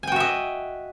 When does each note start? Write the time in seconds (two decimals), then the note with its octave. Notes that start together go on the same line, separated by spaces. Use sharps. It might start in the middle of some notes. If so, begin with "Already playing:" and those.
0.03 G#5
0.07 G5
0.12 F#4
0.16 E5
0.20 D#5